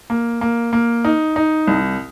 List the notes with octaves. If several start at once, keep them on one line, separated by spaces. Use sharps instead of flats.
A#3
A#3
A#3
D#4
D#4
C2